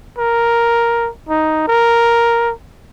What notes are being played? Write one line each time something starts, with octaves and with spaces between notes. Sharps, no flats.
A#4
D#4
A#4